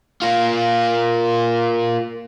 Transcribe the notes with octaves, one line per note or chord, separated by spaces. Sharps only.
A#3 F4